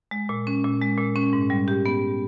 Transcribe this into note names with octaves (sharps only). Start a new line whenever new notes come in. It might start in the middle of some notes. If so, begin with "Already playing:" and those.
G#3
A#2
C#4
A#2
G#3
A#2
C#4
G#2
G3
G4
B3